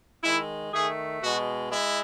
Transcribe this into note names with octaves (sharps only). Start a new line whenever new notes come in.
D#3 G#3 E4
D#3 A3 G#4
B2 G#3 F#4
G#3 E4